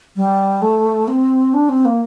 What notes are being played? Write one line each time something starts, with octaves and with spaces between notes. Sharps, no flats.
G3
A3
C4
D4
C4
A#3